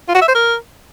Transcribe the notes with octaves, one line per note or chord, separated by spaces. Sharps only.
F4
F#4
E5
C5
A#4